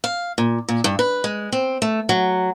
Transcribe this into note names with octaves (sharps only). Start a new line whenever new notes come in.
F5
A#2
A#2
G2
B4
G#3
C4
A3
F#3